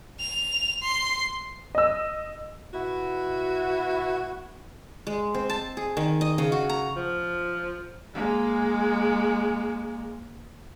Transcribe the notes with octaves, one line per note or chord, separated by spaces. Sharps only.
F7
C6
D#5 E6
B2 E4 F#4
G#3
C4
A5
G#4
D#3
D#5
C#3
F#4
A#5
F3
G#3 A#3